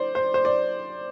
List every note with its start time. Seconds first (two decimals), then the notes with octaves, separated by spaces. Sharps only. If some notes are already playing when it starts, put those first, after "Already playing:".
Already playing: C5 D5
0.15 C5
0.34 C5
0.45 D5